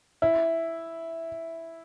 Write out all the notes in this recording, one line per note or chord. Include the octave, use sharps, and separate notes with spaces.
E4